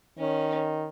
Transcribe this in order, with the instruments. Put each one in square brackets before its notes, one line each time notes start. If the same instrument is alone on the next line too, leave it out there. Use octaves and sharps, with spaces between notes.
[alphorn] D#3 [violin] C#4